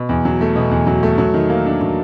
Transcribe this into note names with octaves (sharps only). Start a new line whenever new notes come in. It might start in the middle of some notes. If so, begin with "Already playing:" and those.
Already playing: B2
E2
F#3
A3
B2
E2
F#3
A3
F#3
D#3
A#3
D4
F#3